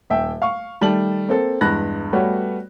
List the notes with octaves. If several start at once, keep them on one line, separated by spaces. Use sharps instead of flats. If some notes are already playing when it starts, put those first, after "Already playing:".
D#1 E5 G5
F5 C#6
D#3 G3 A3 A5 F#7
A#3 C4 A4
E2 G2 G#3 B5 F#6 A#6
G3 A3 B3 F#4 B4 C#5